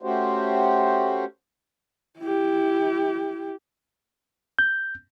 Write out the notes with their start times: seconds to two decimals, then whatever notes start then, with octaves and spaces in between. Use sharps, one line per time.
0.03 A3 C#4 F#4 G4 C5
2.19 E4 G4
4.59 G6